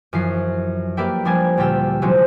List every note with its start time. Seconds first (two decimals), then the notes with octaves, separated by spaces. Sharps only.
0.13 F#2 E3 F3 C7
0.97 A#3 G4 B4 D5 E5 G5
1.25 F3 G3 A#3 D4 G#5 G#6
1.57 D2 A#2 F4 G4 G5 E6
2.02 C3 E3 F#3 G#3 C4 C#4